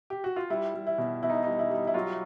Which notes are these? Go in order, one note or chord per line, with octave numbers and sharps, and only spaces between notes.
G4
F#4
F4
G3 E4
G3
E4
B2
B2 E4
D#4
D#4
G3
E4
G3
E4
F#3 F4